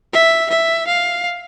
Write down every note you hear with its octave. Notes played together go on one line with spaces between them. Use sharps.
E5
E5
F5